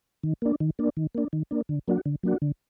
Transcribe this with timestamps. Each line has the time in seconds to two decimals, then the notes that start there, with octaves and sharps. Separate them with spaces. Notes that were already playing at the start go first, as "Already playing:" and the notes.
0.23 D#3
0.42 A#3 D4
0.60 D#3
0.79 A#3 D4
0.97 D#3
1.15 A#3 D4
1.33 D#3
1.51 A#3 D4
1.69 D3
1.88 F#3 A#3 D4 F#4
2.06 D3
2.23 F#3 A#3 D4 F#4
2.42 D3